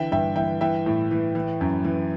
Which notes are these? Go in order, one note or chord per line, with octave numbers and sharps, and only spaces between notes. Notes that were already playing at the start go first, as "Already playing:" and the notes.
Already playing: D3 E3 E5 G5
G2 E5 G5
E3 E5 G5
E3 E5 G5
A2
E3
E3
F#2
E3